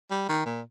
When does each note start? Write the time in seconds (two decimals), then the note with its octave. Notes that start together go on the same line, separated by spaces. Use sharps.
0.11 G3
0.29 D#3
0.46 A#2